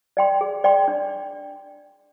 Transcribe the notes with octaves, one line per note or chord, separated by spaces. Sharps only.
D5 G5 C6
G#4
D5 G5 C6
D4